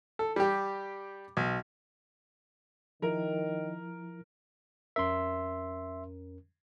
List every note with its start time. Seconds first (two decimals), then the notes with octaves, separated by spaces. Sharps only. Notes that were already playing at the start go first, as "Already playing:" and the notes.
0.19 A4
0.36 G3 G4
1.37 B1
3.02 D#3 F3 E4 A#4
4.96 F2 C#4 A#4 E5 C6